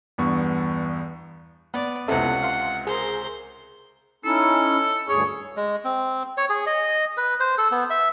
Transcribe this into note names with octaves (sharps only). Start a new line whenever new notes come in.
E2 G2 B3 C#6
B3 D5
C#2 C3 B3 E4 A4 F#5
F5 C6
G#4 A#4 C5
C#4 D#4 E4 A4
D2 G2 G#4 C#5
G#3
C4
C#5
G#4
D#5
B4
C5
A4
B3
E5